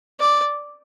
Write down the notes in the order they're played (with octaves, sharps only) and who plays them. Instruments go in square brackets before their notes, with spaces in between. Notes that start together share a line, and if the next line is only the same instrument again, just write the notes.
[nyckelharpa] D5